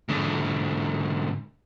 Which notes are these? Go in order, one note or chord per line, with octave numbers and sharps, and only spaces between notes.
G#2 D3